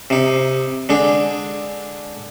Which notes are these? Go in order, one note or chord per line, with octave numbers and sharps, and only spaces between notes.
C3 D#4
D3 G#3 D4